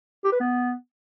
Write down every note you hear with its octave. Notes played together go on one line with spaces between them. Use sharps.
G4
B4
B3